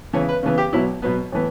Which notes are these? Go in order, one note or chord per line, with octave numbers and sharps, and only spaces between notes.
C#3 E3 B3 C#5
B4
C#3 E3 B3
G4
B2 F#3 B3 E4
B2 F#3 B3
A2 E3 B3